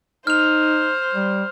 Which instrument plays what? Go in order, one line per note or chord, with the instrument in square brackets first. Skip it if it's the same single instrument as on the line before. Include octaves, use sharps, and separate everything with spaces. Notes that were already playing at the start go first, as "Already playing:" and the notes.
[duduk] D#4 [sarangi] C5 [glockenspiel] F6 F7
[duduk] G3